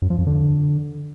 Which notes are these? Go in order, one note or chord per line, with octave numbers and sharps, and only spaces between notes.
F#2
F3
F2
D3